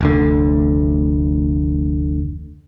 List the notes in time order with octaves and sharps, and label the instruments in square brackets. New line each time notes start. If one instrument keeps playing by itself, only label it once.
[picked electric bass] F1 D2 D3